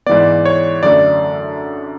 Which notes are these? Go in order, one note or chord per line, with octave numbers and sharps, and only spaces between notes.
G#2 E3 B3 D5
C#5
F#2 D3 A3 D5